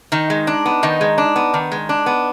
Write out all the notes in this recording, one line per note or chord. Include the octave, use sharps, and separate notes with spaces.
D#3 D#4
G#3
D4
B3
D#3 D#4
G#3
D4
B3
D#3
G#3
D4
B3